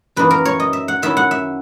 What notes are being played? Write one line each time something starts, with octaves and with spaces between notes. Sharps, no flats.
F#2 E3 A#3 D#4 B4
A#4
C#5
D#5
E5
F#5
D#3 F#3 C#4 E4 E5
F#5
E5